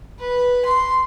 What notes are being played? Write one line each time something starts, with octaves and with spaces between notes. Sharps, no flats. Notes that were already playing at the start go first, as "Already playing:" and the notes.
B4
C6